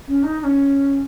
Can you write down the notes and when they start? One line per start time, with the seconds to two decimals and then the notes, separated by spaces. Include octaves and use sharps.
0.07 C#4
0.23 D#4
0.39 D#4
0.44 C#4